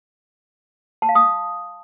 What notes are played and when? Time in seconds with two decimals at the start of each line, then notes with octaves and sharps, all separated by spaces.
1.02 A5
1.09 F5
1.15 D#6